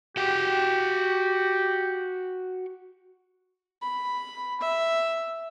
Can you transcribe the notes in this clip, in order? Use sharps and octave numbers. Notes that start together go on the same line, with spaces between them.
F#4 G4 G5
B5
E5